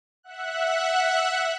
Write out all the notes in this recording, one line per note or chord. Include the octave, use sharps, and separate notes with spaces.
E5 F#5 F#6